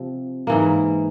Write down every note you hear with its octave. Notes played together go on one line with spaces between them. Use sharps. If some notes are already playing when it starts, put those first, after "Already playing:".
Already playing: C3 F3
G#2 E3 A#3